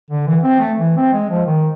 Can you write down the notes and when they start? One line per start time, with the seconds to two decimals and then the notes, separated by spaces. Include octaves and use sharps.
0.11 D3
0.28 E3
0.43 C4
0.60 A3
0.79 E3
0.97 C4
1.12 G#3
1.31 F3
1.46 D#3